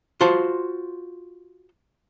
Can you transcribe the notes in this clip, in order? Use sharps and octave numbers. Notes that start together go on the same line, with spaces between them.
F4 F#4 C5 A5